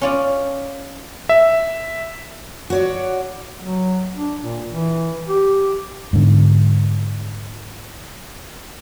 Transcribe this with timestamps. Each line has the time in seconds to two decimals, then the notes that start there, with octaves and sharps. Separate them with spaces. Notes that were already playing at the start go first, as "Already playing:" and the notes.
0.01 C#4 F4 D5
1.29 E5
2.70 F#4 C#5 D5
3.61 F#3
4.15 D4
4.42 A#2
4.70 E3
5.29 G4
6.13 G#2 D3